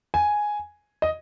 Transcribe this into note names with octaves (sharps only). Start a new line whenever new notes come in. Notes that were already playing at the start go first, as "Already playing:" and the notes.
G#5
D#5